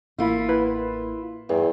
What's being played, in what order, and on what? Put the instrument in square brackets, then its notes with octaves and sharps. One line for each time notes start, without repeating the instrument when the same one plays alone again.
[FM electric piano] A1 A#3 B5 [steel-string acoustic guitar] E4 F4
[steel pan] B4
[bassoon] E2 [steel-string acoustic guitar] G2